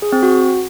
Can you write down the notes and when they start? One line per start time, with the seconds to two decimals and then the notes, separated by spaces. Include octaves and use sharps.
0.02 G#4
0.12 C4
0.23 F#4